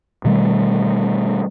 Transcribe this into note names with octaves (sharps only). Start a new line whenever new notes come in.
B2 D#3 G3 A3